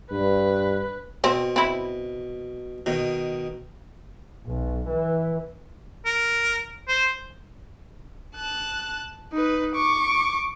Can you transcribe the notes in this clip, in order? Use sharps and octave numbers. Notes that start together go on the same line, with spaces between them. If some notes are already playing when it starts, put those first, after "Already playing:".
G2 B4
B2 C4
C4 E4
B2 D#3
B1
E3
A#4
C5
A5 F#6
D#4 B4
C#6 D6